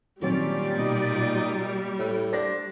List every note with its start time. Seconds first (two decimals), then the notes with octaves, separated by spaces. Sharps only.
0.22 A#2 D#3 F#3 G3 C4 C#4 D5
0.78 B2 D#4
1.99 A2
2.33 D4 C5 A#6